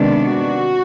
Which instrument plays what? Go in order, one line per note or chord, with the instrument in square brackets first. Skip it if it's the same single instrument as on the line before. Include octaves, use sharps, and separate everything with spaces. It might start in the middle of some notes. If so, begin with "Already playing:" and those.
Already playing: [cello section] C3 D#3 G#3 B3 D4
F#4